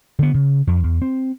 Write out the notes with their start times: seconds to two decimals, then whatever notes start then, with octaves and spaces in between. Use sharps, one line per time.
0.19 D3 B3
0.34 C#3
0.67 F2
0.84 E2
1.02 C4